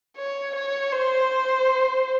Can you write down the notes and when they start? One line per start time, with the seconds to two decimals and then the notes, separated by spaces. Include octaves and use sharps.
0.17 C#5
0.55 C#5
0.92 C5